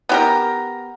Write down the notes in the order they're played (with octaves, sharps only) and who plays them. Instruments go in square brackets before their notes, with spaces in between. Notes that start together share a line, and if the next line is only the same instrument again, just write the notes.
[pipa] B3 G4 A#4